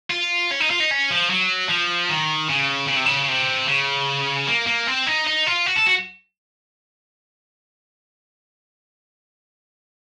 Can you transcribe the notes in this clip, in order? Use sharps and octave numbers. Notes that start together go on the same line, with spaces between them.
F4
C#4
D#4
F4
D#4
C#4
F3
F#3
F3
D#3
C#3
C#3
C3
C#3
C3
C#3
A#3
A#3
C4
D#4
D#4
F4
F#4
A4
F#4